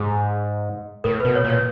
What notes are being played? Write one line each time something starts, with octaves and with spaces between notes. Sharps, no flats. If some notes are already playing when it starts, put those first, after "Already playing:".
Already playing: G#2 G#4
A2 A#4
B2 B4
C#5
A#2
C#5